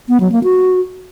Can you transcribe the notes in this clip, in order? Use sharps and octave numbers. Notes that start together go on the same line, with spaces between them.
B3
F#3
A#3
F#4